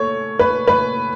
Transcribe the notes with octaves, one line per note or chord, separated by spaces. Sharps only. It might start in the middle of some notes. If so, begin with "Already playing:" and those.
Already playing: A3 C#5
B4
B4